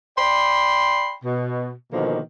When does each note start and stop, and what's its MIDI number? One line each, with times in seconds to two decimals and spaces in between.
0.18 1.15 74
0.18 1.15 79
0.18 1.15 83
0.18 1.15 84
1.25 1.72 47
1.93 2.20 47
1.93 2.20 50
1.93 2.20 51
1.93 2.20 53
1.93 2.20 58